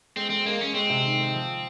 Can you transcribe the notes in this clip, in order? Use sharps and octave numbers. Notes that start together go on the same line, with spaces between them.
G#3 C4
G#3 C4
G#3 A#3
G#3 C#4
G#3 C4
C3
D#3
G#3
F3